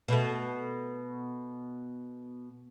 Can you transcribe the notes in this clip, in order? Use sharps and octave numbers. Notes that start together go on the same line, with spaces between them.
B2 A3